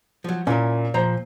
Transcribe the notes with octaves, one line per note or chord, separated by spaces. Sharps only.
F3 F#3
A#2 C#4 E4 A#4
A#2 F3 C5 A#5